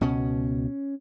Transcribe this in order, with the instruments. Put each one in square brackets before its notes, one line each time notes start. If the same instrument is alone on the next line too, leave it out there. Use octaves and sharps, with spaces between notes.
[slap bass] C#2 B2 C#4